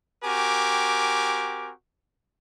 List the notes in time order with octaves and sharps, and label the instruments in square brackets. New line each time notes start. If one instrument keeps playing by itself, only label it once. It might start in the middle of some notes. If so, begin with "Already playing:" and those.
[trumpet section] C4 F#4 G4 A#4 G#5 D6